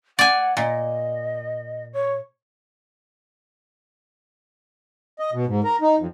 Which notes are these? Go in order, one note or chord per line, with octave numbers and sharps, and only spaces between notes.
D5 F#5 G#5
A#2 D#5
C#5
D#5
B2
G#2
A#4
D#4
F2